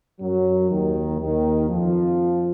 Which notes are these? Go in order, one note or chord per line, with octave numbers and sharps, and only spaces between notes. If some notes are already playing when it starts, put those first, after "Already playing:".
F#2 F#3
D#2 D#3
D#2 D#3
F2 F3